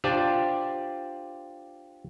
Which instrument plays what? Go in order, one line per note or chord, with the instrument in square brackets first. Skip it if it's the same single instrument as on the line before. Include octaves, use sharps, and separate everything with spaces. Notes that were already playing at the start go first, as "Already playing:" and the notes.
[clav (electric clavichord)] D4 F4 G4 C5 D5